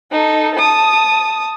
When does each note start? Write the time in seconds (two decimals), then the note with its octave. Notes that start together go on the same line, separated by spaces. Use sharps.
0.11 D#4 A4
0.55 A5 D#6